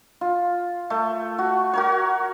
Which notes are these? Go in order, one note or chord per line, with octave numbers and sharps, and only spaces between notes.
F4
A3
F#4
F#4 A#4 C#5